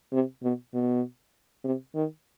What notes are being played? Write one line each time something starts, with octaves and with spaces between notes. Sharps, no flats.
C3
B2
B2
C3
D#3